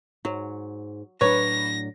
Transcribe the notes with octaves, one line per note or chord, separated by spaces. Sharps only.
G#2 F#3
A2 F#3 D4 B4 C#5 A#6